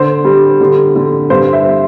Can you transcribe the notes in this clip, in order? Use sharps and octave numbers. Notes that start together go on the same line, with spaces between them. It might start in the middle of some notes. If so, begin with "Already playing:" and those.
Already playing: D3 C5
G3
D3
D3
G2 C5
C5 E5